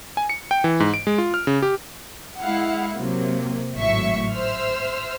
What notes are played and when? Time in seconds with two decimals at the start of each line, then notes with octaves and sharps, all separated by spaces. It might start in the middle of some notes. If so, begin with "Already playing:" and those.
0.17 G#5
0.29 C#7
0.51 G5
0.64 E3
0.80 G#2
0.94 D7
1.07 G#3
1.18 F4
1.34 F6
1.47 C#3
1.62 G4
2.40 G#3 E4 F5 F#5
2.96 C3 F#3 A#3
3.74 G#1 A2 F#3 E5 C#6
4.34 C5 E5 E6 F6